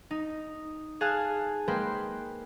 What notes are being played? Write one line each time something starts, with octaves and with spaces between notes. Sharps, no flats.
D#4
G#4 F5 G#5 A5 F#6
G#3 A#3 B4 C5 G5